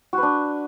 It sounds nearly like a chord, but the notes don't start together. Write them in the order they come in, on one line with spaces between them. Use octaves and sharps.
F#4 B4 D4